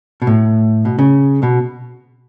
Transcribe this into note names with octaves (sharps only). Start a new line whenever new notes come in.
B2
A2
B2
C#3
B2